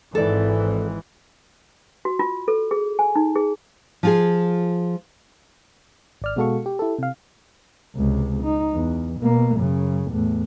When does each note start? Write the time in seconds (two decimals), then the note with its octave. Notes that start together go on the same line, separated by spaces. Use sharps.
0.15 G#1 G#2 E3 A4 D5
2.05 F#4
2.19 F4
2.48 A4
2.71 G#4
2.99 G#5
3.16 D#4
3.35 G#4
4.03 F3 F4 G#4
6.22 G#1 D5 F6
6.36 B2 G#3 F#4 A4 F5 C#6
6.66 G4
6.79 E4 G4 A4
6.98 C3 F5
7.96 C#2 C3
8.43 D#4
8.74 E2
9.20 B2 A#3
9.57 F#2 C#3
10.11 E2 A2